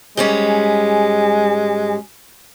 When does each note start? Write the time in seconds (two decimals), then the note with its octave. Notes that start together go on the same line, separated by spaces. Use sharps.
0.17 G#2 G3 G#3 C#4